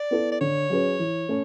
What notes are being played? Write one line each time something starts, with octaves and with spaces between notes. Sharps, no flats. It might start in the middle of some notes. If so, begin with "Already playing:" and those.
Already playing: D5
B3 E4 A4
D5
D3 C#5
F#3 C#4 G#4 B4
E3
A3 C#4